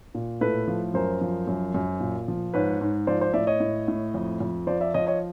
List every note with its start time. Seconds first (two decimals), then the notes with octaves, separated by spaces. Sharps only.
0.14 A#2
0.41 A2 A4 B4
0.68 F3
0.94 F#2 A#4 C5
1.21 F3
1.47 F#2
1.75 F#2
2.00 A#2
2.28 F3
2.54 G#2 B4 C#5
2.81 G#2
3.07 F3 C5 D5
3.20 C5 D5
3.33 A2 D5 E5
3.47 C#5 D#5
3.60 A2
3.88 A2
4.14 F2
4.40 F2
4.67 F3 C5 D5
4.81 D5 E5
4.94 F3 C#5 D#5
5.07 C#5 D#5